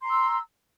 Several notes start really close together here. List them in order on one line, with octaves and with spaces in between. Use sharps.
C6 A#5 E6